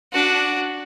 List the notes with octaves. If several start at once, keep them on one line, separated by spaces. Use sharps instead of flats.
D4 F#4